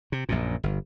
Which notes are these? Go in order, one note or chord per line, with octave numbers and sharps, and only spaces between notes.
C3
A#1 F#2 A#2
G1